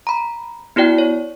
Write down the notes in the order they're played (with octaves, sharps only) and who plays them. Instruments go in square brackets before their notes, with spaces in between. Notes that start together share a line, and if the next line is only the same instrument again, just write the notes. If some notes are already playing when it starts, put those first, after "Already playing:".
[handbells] A#5 B5
B3 E4 F#4 D5 G5
C#5